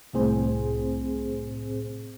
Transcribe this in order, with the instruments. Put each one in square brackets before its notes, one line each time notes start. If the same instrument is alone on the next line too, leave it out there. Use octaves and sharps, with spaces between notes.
[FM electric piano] C2 A2 C4 G#4 C5